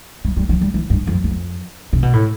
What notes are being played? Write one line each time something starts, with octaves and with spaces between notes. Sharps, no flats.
G3
G3
F3
G3
E3
G2
F2
F2
C3
B2
A2